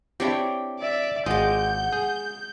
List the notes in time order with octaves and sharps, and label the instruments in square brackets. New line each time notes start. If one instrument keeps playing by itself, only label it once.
[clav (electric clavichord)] C4 D4 E4 [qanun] G4 C#5 G5
[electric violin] D5 E5
[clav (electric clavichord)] G#1 F4 D#5 [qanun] G#3 D6 [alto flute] F#5 [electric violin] G6
[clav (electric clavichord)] G#4